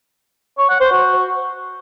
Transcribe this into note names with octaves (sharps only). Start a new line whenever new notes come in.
C#5
F#5
C5
F#4